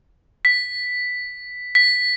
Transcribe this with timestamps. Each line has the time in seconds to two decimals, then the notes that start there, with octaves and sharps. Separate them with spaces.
0.45 B6
1.75 B6